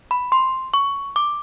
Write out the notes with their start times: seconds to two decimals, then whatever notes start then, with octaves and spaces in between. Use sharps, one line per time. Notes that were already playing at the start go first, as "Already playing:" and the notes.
0.11 B5
0.32 C6
0.74 C#6
1.16 D6